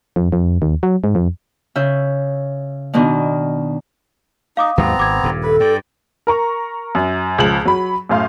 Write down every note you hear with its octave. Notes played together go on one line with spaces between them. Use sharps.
F2
F2
D#2
F#3
G#2
F2
C#3 E5 G6
B2 D#3 B3 D4
D#4 F5 D6 D#6
D#2 G#2 F#3 B3 C4 A#5
G#1 D6 G#6
D#1 G2
A4 B4
G2 D5 G5
A#4 A#5 C#6
F#2
C#2 F3 F#7
F#3 B5
F#2 A2 F5 C6